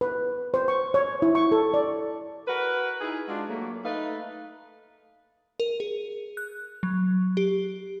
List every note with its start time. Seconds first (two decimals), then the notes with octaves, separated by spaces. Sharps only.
0.01 B4
0.54 C5
0.68 C#6
0.94 C#5
1.22 E4
1.35 C#6
1.52 A4
1.74 D5
2.47 F#4 A#4 B4
3.01 D#4 E4 G#4
3.28 G#3 D4 F4 F#4
3.49 F#3 A3 A#3
3.85 A3 D#4 B4 F5
5.60 A#4
5.80 G#4
6.37 F#6
6.83 F#3
7.37 G4